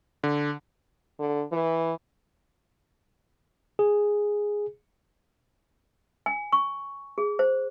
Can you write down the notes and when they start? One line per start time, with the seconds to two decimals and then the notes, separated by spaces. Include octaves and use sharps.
0.24 D3
1.19 D3
1.52 E3
3.79 G#4
6.26 G#5
6.52 C#6
7.18 G#4
7.39 C5